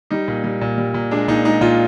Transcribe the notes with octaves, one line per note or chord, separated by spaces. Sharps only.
G3 D#4
A#2
G3
A#2
G3
A#2
G#3 D4
A#2 D#4
G#3 D#4
A#2 F4